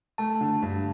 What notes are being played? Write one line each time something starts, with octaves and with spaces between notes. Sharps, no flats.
A3 A5
D3
G2